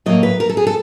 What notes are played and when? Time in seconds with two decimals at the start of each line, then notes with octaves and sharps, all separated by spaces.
0.06 A2 F#3 A#3 D#5
0.23 B4
0.40 A#4
0.49 A4
0.57 G#4
0.67 A4